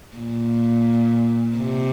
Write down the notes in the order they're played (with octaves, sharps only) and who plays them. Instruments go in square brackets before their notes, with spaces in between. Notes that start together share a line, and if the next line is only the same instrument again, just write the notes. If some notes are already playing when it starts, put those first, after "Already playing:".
[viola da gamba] A#2
C3